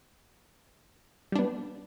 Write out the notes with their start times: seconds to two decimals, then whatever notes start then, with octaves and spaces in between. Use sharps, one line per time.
1.32 G3
1.36 D4
1.39 B3